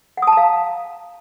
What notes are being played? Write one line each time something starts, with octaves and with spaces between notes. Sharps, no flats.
F5 F#5 A5 A#5 D#6